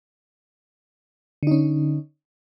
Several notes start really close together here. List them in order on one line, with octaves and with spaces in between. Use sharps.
D3 D#4 C#4